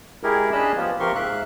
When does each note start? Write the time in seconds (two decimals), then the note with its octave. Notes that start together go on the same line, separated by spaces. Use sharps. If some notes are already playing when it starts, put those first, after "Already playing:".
0.24 G#3 E4 G4 G#4 A#4
0.52 C#4 D4 G#4 D#5 A5 B5
0.76 F3 B3 F4 G4
1.00 C3 F3 G4 A#4 C6 C#6
1.15 G#2 E5 F5 F#6